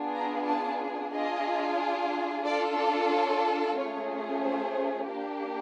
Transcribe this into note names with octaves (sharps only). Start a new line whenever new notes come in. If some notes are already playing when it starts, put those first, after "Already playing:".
Already playing: B3 D4 F4 G#4
A#5
A5
D4 F4 G#4 D#5
D4 F4 A4 D5
D5
C#5
A3 C#4 F4 G#4 C#5
C5
A#3 D4 G4